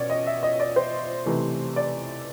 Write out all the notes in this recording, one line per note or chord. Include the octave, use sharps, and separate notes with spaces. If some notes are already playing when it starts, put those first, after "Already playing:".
Already playing: B2 C#4 C#5 D5
D#5
E5
D#5
D5
C5
C3 E3 A3
D5